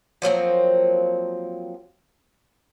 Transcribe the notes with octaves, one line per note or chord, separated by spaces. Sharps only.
F3 F#3 A#3 C4